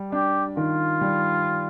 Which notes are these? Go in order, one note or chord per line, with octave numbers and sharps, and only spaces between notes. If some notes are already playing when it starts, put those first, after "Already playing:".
Already playing: G3
D4 G4
D#3 F4
G3